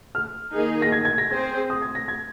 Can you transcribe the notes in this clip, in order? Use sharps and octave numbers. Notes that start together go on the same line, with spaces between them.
F6
D#3 A#3 D#4 G#4
A#6
G#6
G#6
A#6
C4 G#4 C5 G#6
D#6
G#6
A#6
G#6